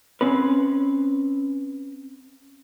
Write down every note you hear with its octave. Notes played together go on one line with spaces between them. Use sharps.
C4 C#4 B4